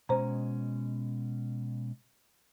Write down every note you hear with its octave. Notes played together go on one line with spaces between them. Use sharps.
B2 G#3 C#4 C5 A#5